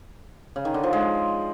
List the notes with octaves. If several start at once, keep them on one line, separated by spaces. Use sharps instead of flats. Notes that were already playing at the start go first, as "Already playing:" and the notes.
C#3
D#3
D3
F3
G#3